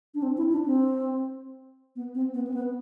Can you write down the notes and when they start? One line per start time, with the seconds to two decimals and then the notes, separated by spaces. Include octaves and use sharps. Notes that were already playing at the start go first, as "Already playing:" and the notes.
0.15 D4
0.22 C4
0.37 E4
0.52 D4
0.66 C4
1.96 B3
2.15 C4
2.34 B3
2.47 C4
2.54 B3